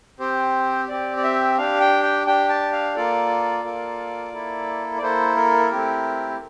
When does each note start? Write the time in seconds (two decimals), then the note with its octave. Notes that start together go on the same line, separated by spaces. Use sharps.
0.19 C4 G4 C5
0.88 C4 G4 D5
1.17 D5
1.23 E5
1.58 D4 G4 F5
1.80 G5
2.03 G5
2.27 D4 G4 G5
2.49 A5
2.72 F5
2.95 A#3 F4 A4 D5
3.64 A#3 F4 A4
4.33 A#3 E4 A4
4.98 D5
5.02 A#3 E4 A4 C5
5.36 A#4
5.71 A3 C4 E4 G4